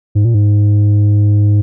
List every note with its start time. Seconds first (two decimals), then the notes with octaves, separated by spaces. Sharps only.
0.15 G#2
0.25 A#2
0.34 G#2